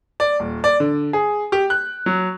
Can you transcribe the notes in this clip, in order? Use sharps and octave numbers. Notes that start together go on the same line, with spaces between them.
D5
D#1
D5
D3
G#4
G4
F#6
F#3